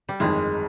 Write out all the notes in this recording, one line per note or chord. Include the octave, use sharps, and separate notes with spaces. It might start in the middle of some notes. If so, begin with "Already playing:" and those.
G3
G1 F2 D#3 G#3